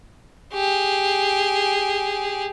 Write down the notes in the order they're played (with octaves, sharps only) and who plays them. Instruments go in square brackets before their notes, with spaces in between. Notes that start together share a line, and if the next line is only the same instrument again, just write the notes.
[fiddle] G4 G#4